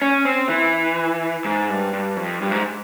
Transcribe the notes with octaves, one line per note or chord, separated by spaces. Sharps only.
C#4
C4
E3
G#2
G2
G2
F2
G2
G#2